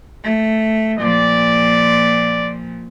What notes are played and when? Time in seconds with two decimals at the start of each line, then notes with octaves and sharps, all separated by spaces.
0.24 A3
0.99 A#2 F3 D5